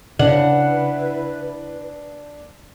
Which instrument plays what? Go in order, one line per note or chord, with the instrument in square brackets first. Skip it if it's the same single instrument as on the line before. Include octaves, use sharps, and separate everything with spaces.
[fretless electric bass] C#3 [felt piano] D4 [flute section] E4 B4 [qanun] F#5